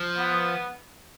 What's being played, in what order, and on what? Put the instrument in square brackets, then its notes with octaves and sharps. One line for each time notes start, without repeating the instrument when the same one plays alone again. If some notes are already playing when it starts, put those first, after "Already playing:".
Already playing: [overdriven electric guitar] F3
[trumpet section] B3